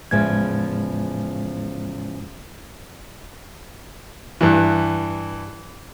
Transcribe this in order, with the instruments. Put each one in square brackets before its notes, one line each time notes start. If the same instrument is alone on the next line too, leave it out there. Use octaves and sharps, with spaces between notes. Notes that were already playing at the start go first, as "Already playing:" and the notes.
[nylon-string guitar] E2 C#3 F3 [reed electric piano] A2 G#3 G#6
[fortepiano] G2 E3